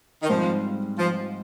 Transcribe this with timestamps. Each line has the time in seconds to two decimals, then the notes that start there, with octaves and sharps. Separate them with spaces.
0.23 D#3
0.29 G#2 F3 G3 C4
0.98 F3